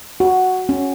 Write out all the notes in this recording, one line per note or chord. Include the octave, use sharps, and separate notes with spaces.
F#4
C#4